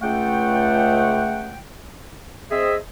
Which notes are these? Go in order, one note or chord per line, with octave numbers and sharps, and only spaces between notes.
C#2 A3 F#5 G5
C4 G#4 D#5 E5